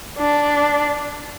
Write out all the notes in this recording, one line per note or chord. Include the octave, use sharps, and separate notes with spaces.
D4